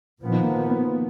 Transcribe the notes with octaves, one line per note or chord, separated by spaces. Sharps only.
A#2 F3 B3
D#3
A#3
B3